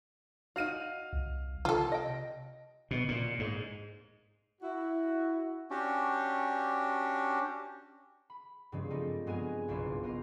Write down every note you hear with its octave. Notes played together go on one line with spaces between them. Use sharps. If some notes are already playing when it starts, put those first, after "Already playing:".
D#4 F#4 F5 F6 D#7
C2
C3 F4 A4
D#5 G5
B2
A#2
G#2
E4 F#4
C#4 D4 F#4 G4
B5
G2 C#3 F3 G3 G#3 C4
G3 A3 A#3 C4 D#4 F4
G2 G#3 B3 G#4 A#4 G#5
F#1 B1 E4 F4 C6 D6
B3 A#4 C5